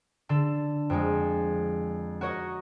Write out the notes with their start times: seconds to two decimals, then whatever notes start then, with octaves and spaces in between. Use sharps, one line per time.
0.29 D3 A4
0.90 F2 G#3
2.21 F#4 A#4 C#5 D#5